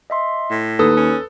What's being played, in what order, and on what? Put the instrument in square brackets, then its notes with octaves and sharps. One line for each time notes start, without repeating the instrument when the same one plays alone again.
[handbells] D#5 E5 C6
[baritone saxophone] A2
[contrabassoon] D#2 [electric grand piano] A4 [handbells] B4 D#6
[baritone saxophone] C#4